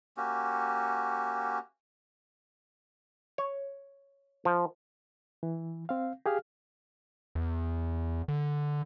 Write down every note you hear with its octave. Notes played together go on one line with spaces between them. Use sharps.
A#3 C#4 F#4 G4
C#5
F3
E3
C4 F5
G4 G#4 F5 F6
E2
D3